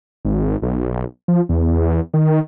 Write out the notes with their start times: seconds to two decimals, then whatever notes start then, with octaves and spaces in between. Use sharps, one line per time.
0.25 G#1
0.62 B1
1.28 F3
1.49 E2
2.14 D#3